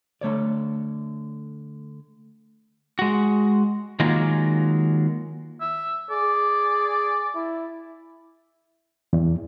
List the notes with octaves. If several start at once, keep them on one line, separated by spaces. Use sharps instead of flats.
D3 A3 C#5 D5
G#3 F#4
D#3 F#3 G#3 A#3 F4
E5
G#4 D5
E4
E2